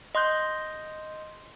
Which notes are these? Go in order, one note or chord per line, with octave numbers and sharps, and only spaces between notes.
D#5 C6 F#6 G6